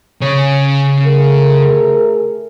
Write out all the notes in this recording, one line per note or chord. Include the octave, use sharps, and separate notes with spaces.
C#3 C#5
A3 G#4 A#4